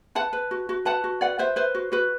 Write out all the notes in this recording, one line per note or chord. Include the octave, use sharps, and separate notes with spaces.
B4 F#5 A5
B4
F#4
F#4
B4 F#5 A5
F#4
B4 D5 F#5
B4 C5 E5
B4 C5
F#4
F#4 B4